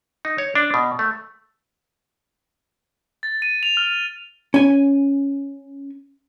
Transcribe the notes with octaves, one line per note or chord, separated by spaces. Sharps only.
D#4
C#5
D4
B2
A3
A6
D#7
F7
F6
C#4 G#5